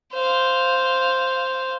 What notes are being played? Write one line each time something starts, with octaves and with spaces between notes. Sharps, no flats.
C5 F5